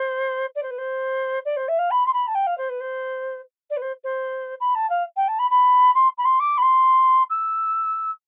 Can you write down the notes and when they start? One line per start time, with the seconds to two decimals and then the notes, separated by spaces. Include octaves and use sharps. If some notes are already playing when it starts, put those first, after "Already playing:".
Already playing: C5
0.55 D5
0.62 C5
0.70 B4
0.78 C5
1.45 D5
1.56 C5
1.68 E5
1.78 F5
1.90 B5
2.06 C6
2.13 B5
2.27 A5
2.34 G5
2.46 F5
2.57 C5
2.69 B4
2.80 C5
3.70 D5
3.76 B4
3.81 C5
4.03 C5
4.60 B5
4.74 A5
4.89 F5
5.16 G5
5.27 A5
5.38 B5
5.50 B5
5.94 C6
6.17 B5
6.24 C6
6.39 D6
6.57 B5
6.62 C6
7.29 E6